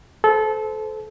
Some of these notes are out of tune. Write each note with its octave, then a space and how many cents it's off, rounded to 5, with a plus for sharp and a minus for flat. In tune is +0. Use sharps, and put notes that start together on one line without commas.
A4 -25 C5 -30